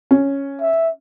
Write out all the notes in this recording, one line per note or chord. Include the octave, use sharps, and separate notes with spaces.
C#4
E5